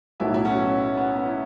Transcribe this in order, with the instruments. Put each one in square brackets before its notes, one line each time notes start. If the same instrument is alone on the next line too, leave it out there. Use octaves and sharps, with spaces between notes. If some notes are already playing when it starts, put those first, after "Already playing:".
[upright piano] B1 A2 F#3 A3 [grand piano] B3 E4
[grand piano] E4
C#4 F#4
B3
B3
E4